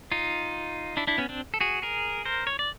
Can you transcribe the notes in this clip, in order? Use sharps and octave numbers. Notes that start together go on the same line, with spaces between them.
D#4 F4
D4 E4
D4 E4
B3 C#4
C4 D4
A4
F#4 G#4
G#4 A#4
A#4 C5
C#5
D5